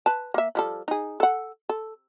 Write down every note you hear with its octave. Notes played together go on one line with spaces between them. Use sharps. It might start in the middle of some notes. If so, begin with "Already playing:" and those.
B4 A5
A#3 E5
F3 G3 A4
D#4 G#4
A4 F#5
A4